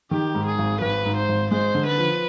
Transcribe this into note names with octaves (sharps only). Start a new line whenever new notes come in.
D#3 G4
G#2
G#4
G#1
G#1 B4
G#2
C5
G#1
G#3 C5
D3
B4
F3